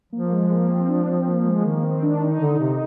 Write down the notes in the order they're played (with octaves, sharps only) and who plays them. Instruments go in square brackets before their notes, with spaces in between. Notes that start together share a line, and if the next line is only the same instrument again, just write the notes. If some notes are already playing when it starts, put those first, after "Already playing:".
[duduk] F3 [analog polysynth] A#3
[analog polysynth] G#3
A#3
C4
D4
C4
A#3
G#3
[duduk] D#3 [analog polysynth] A#3
[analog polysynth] C4
D4
D#4
[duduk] D3
C3